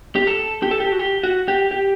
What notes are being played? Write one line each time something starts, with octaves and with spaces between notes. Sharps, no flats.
G4
A4
G4
A4
G4
F#4
G4
F#4
G4
G4